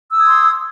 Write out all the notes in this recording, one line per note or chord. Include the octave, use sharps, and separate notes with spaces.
C6 D#6 E6 G#6